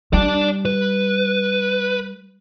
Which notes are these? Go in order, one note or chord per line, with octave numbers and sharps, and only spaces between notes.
G3 D5 A5
B4